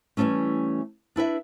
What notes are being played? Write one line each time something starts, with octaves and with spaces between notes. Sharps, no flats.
E3 F3 G3 A3 C#4
D4 E4 B4 E5